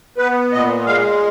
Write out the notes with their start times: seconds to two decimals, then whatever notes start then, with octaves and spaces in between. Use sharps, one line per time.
0.18 B3 B4
0.52 A#2 D#5
0.86 G#3 F5